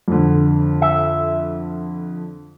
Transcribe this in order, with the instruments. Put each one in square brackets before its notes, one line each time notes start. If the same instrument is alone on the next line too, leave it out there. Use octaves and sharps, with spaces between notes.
[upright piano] F2 D3
[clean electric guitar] E5